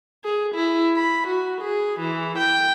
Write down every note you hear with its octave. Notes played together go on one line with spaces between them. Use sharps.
G#4
E4
B5
F#4
G#4
E3
G5